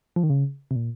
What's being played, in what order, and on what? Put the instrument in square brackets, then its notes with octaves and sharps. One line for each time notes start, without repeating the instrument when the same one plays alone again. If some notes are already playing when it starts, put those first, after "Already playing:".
[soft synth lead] F3
D#3
C#3
C3
A#2